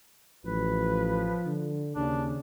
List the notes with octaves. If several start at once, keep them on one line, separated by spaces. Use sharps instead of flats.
A1 F3 B4
D3
D#2 C#3 D4